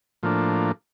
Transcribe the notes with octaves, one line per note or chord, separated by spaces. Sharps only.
A2 F3 A#3 D4